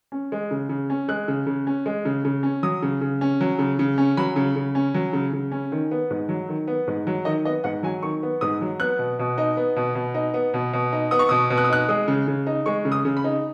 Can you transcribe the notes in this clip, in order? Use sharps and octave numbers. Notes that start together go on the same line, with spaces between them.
C#4
G#3
C#3
C#3
C#4
G#3 F#6
C#3
C#3
C#4
G#3
C#3
C#3
C#4
F#3 D#6
C#3
C#3
C#4
F#3
C#3
C#3
C#4
F#3 B5
C#3
C#3
C#4
F#3
C#3
C#3
C#4
D#3
B3
G#2
F#3
D#3
B3
G#2
F#3
D#3 D#5
B3 D#5
G#2 F#5
F#3 G#5
D#3 C#6
B3
G#2 D#6
F#3
B3 F#6
B2
B2
D#4
B3
B2
B2
D#4
B3
B2
B2
D#4
B3 D#6
C#6
B2 D#6
B2
F#6
D#6
D#4 F#6
G#3 D#6
C#3
C#3
D#4
G#3 C#6
C#3
D#6
C#3
B5
D#4